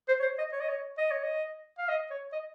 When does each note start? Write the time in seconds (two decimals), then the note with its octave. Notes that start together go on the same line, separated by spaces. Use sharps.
0.08 C5
0.20 C#5
0.22 C5
0.38 D#5
0.52 C#5
0.61 D#5
0.68 C#5
0.98 D#5
1.11 C#5
1.24 D#5
1.78 F5
1.88 D#5
2.11 C#5
2.33 D#5